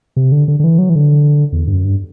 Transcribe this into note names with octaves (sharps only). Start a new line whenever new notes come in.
C3
D3
D3
D3
E3
F#3
E3
D3
E2
G2
F#2
G2